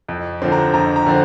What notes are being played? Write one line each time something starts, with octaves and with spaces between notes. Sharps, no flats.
F2
D3 F3 C4
A#5
F2 A#5
A#5
D3 F3 C4